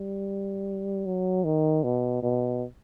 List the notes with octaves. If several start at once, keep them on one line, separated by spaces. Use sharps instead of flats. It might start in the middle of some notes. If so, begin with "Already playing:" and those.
Already playing: G3
F#3
D#3
B2
B2